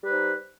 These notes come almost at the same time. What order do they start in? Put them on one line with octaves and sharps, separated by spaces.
G3 B4 D#4 C5